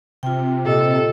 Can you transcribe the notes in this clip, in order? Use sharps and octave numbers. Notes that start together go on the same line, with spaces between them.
C3 F4 G5
A#2 G4 A4 D#5